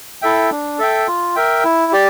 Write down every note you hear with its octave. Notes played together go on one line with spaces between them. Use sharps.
E4 A4 E5 G5
D4
A4 E5 G5
F4
A#4 E5 G5
E4
G4 D5